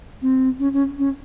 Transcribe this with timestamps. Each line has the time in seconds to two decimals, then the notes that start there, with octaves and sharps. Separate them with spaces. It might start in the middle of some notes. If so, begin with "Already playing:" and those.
0.22 C4
0.60 C#4
0.73 C#4
0.99 C#4